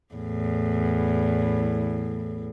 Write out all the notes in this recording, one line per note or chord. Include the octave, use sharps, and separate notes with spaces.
E2 A2